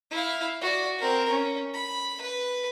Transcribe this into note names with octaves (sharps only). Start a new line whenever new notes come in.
E4 F5
F#4 D5
C4 A#4
C#4
B5
B4